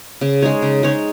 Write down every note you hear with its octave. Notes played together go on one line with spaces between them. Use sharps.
C#3
G#3 D#4 C#5
C#3
G#3 D#4 C#5